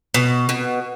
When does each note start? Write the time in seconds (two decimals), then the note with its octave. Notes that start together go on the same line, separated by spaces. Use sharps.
0.14 B2
0.49 B2